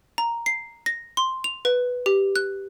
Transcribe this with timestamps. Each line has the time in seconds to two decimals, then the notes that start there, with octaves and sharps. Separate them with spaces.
0.18 A#5
0.46 C7
0.86 A#6
1.17 C6
1.44 F7
1.65 B4
2.06 G4
2.36 F#6